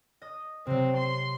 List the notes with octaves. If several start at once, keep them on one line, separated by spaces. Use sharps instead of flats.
D#5 D#6
C3 F#3 C4
C6